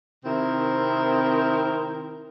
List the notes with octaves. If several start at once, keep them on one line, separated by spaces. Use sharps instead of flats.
C3 D#3 C4 E4 A#4